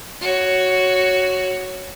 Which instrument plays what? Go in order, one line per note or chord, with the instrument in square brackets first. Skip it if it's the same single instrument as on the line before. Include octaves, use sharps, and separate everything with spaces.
[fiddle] F#4 C#5